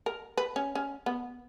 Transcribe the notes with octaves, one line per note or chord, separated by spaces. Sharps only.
A#4
B4
C#4
C#4
B3